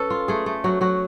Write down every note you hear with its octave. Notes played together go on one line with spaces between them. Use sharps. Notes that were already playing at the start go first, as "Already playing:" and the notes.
Already playing: C#4 A4 B4
F4
A3 G#4
A3
F#3 F#4
F#3 F#4